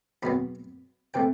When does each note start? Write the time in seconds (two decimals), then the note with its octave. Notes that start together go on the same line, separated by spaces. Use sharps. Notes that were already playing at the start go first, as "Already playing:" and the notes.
0.23 E2 B2 F#3 B3 B5
1.14 C3 E3 A3 G5